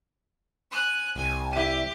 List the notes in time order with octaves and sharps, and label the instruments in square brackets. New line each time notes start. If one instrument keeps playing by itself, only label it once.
[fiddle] G#5 F#6
[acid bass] C2 [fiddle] G#5
[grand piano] E4 D#7 [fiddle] G4